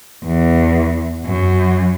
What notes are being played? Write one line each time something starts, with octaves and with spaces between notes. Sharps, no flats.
E2
F#2